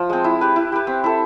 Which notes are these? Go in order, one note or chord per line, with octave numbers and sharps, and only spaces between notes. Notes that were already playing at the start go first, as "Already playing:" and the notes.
Already playing: F3
G#3 C4
E4
G4 B4
E4
G4 B4
C4
E4 A4